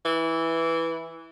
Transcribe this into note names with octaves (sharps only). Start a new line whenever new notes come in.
E3